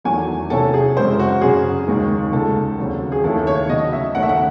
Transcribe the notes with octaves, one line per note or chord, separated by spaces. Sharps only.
E2 D#3 F#3 A3 G#5
C3 F#3 C#4 E4 A4
G#4
F#2 C#3 G#3 C4 E4 C5
F#4
F#2 C#3 F#3 G#4
D#2 D#3 G#3 D#4
C#2 C#3 G#3 A4
D#2 C#3 F#3 C4
G#4
D#2 D#3 A3 C#4 E4 A4
C#5
C#3 F#3 A3 D#5
E5
D#2 D#3 A3 C#4 F#5
E5
F#5